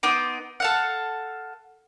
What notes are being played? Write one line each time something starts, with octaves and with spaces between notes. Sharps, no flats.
B3 D#4 C6 D6
A4 F5 F#5